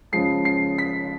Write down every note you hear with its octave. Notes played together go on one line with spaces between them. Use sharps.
C#3 F3 G#3 C7
C7
B6